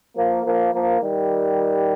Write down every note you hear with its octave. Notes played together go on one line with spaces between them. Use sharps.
F3 A#3
F3 A#3
F3 A#3
D#3 G3